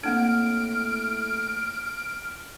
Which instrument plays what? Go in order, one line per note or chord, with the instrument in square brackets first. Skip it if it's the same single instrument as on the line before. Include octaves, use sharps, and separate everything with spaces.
[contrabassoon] A2 [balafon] A#3 C4 D4 [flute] F6 [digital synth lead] D7